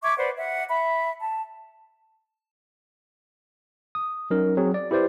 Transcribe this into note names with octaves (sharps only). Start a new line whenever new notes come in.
E5 C#6 D6 G#6
B4 C5 D5 F#5
E5 F#5
E5 B5
A5
D#6
F#3 C#4 D#4 A#4
F#3 C4 G#4
D5
E4 G4 B4 C5 D5